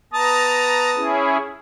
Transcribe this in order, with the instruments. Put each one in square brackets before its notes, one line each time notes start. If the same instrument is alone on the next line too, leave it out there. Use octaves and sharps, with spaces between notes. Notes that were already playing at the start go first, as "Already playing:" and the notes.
[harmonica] B3 A5 D#6 [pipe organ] A#5
[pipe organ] C#4 E4 G#4